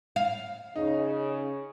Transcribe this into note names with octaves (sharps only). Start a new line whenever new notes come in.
F5
C#3 D#4